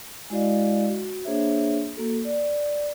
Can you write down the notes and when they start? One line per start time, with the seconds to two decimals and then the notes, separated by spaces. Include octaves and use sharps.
0.30 G#3 E4 F#4 D5 D#5 F5
0.89 F#4
1.25 A#3 D4 G#4 C5 C#5 E5
1.97 A#3 F#4 A4
2.25 D5